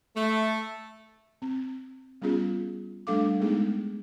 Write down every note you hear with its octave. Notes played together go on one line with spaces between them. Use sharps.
A3
C4
G3 B3 C#4 F4 G#4
G3 A3 D4 A4 F5 D6
G#3 A3 B3 D#4 G#4